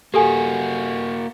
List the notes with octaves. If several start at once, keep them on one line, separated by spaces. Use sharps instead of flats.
A#3 F#4 G4 A4 G#5